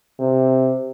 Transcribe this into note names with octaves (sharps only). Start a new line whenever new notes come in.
C3